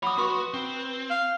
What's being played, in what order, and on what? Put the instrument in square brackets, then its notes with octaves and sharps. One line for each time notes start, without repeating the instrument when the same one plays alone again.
[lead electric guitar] C#5 F#5 [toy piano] B5 D#6
[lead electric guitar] F#4 [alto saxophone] B4 [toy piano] C6 C#6
[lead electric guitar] C4
[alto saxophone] F5